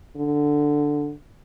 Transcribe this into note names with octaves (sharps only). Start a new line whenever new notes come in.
D3